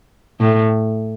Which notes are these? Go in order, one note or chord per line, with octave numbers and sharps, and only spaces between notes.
A2